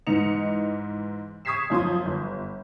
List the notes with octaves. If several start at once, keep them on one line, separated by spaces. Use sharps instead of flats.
G#2 E3 D#4 D#5 C#7 F7
C#6 D#6 G#6 B6 C7 E7
F#2 F3 C6 D#6
G1